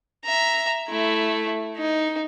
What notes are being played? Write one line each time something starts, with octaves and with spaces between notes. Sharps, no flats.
E5 A#5
A3 E4
D#4